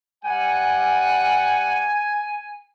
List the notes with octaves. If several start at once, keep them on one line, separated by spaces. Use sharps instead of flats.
G3 F#5 G#5